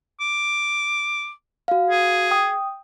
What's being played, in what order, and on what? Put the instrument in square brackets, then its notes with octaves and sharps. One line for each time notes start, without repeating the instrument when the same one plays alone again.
[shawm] D6
[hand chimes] F#4 F5
[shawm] G#4
[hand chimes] G5 D#6